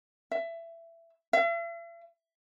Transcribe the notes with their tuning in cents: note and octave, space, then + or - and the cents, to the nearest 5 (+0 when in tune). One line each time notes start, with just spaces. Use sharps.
E5 +20
E5 +45